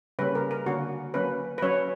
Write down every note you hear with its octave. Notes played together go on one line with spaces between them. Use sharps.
C#3 G3 A#3 C#4 B4
A#4
A#4
D3 A#3 C#4 F#4
F#3 A#3 C#4 B4
B4
F#3 C#4 C#5